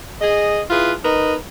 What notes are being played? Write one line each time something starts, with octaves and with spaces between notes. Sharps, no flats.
G#4 D#5
E4 F4 G#4 B4
D#4 A#4 B4 D#5